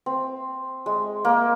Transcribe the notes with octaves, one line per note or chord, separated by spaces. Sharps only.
C4
G#3
A#3